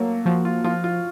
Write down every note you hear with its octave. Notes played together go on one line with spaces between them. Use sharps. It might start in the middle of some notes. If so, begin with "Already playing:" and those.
Already playing: F#3 A3 A#3
F3 F#4
F4
F3 F4
F4